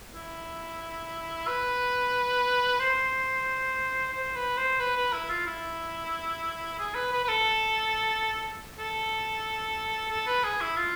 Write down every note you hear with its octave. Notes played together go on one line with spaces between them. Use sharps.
E4
B4
C5
C5
B4
C5
B4
B4
E4
F4
E4
G#4
B4
B4
B4
A4
A4
A4
B4
G#4
E4
F4